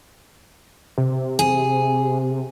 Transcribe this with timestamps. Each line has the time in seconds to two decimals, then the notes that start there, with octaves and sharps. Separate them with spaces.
0.98 C3
1.39 G#4